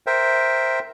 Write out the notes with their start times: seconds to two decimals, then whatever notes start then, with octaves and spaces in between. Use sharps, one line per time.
0.07 A#4 C5 E5 G5